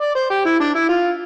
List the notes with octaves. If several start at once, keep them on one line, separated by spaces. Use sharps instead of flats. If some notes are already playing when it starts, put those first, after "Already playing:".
D5
C5
G4
E4
D4
E4
F4